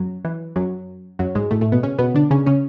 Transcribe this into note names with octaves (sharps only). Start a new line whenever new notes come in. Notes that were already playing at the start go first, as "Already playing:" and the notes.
Already playing: F#2 F#3
E3
F#2 F#3
F#2 F#3
G#2 G#3
A2 A3
A2 A3
B2 B3
C#3 C#4
B2 B3
D3 D4
C#3 C#4
C#3 C#4